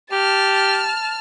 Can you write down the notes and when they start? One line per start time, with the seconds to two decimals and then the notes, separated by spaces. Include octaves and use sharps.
0.12 G4 A5 F6